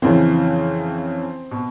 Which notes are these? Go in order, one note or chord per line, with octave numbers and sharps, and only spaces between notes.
F2 C#3 E3 C4
B2